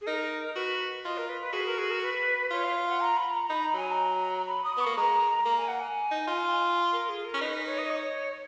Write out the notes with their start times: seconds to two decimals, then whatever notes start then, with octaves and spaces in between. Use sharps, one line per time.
0.01 G#4
0.07 D#4 A#4
0.56 F#4 B4
1.04 F4 D#5
1.17 A#4
1.29 B4
1.41 B4
1.53 F#4 G#4
1.66 A#4
1.78 G#4
1.91 A#4
2.03 B4
2.51 F4 C#5
2.64 F5
2.76 F5
2.89 F#5
3.01 A#5
3.17 B5
3.34 A#5
3.50 D#4 B5
3.64 A#5
3.74 F#3 G#5
3.92 A#5
4.47 B5
4.64 D#6
4.77 B3 C#6
4.86 A#3
4.97 G#3 A#5
5.45 A#3 A#5
5.57 G#5
5.68 F#5
5.80 G#5
6.11 D#4
6.27 F4
6.92 A#4
7.09 G#4
7.25 A#4
7.34 C#4
7.41 D#4 B4
7.66 C#5
7.78 D#5
7.90 C#5